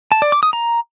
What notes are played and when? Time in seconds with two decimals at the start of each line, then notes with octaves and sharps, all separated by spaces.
0.12 A5
0.22 D5
0.32 D6
0.43 D#6
0.53 A#5